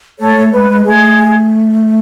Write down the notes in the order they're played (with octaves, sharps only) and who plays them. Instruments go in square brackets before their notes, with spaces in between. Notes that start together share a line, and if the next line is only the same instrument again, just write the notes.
[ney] A3 [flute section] A4 C#5
[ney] A3
[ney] G#3 [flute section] B4
[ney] G#3
[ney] A3 [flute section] G#4